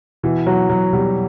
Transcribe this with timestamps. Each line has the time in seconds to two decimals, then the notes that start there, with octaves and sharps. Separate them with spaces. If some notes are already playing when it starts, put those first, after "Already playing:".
0.23 B2 E3
0.47 B2 F#3
0.69 B2 F#3
0.93 B2 G3